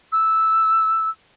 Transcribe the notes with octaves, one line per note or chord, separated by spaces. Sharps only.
E6